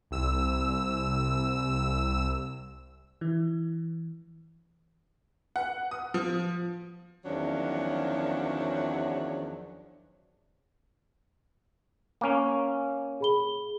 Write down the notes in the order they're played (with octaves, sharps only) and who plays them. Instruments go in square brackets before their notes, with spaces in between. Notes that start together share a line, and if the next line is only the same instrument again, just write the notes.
[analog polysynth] C2 E6
[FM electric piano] E3
[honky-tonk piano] F#5
D#6
F3
[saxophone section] E2 D#3 F3 F#3 C#4 D4
[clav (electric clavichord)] A#3 C#4
[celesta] G#4 B5 G7